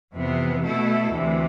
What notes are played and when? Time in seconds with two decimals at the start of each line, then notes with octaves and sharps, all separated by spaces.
0.14 F2 C3 E3 B3
0.63 B2 A3 E4 A4
1.13 D2 C3 E3